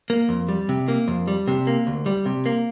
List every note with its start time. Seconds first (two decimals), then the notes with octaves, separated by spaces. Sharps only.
0.10 A#3
0.29 F2
0.49 G3
0.69 C3
0.88 A#3
1.08 F2
1.28 G3
1.47 C3
1.67 A#3
1.87 D2
2.06 G3
2.26 C3
2.46 A#3